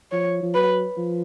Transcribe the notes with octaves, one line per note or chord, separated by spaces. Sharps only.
F3 C#5
F3
F#3 B4
F3